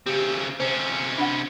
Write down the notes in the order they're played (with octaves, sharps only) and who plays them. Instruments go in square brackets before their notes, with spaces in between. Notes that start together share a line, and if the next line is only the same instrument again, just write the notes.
[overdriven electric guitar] C#3 C4 [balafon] G4
[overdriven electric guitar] C3 C#4 [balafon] C5
[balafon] D4 F#5